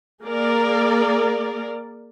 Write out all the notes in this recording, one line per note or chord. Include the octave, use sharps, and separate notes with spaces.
A#3 G#4 A#4 D5